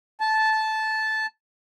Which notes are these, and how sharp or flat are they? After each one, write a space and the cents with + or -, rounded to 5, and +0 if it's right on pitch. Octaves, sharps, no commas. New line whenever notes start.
A5 -10